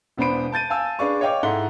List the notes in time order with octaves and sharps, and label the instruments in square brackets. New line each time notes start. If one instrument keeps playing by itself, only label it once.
[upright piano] E1 B3 D4 C5 B5 D7
A5 G6 A6 D#7
F5 G#5 A5 E6
D4 G#4 B4 D5 F5 C#6
C#5 D#5 F5 G5 D6
G#2 E4 A4 F#5 C6 G7